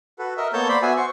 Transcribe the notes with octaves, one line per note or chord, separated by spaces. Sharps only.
F#4 A4 B4
A#4 D#5 E5
A#3 B3 A4 C#5 A5 G6
C5 D5 B5
B3 F#4 E5 G#5
C5 C#6